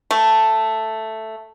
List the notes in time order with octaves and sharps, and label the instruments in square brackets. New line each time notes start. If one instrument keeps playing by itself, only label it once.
[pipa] A3